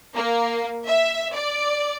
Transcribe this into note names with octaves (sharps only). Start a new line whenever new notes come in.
A#3
E5
D5